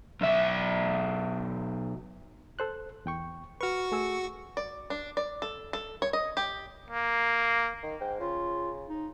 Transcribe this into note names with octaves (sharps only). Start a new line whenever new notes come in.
B1 E5
A4 C5 F#6
E2 G5 C#6
F#4 B4 C#6 F6
A3 G#4 E6
D5
D4
D5
A4
A4
C#5
D#5
G4
A#3
D#3
G#2 G5
C#3 F4
D#4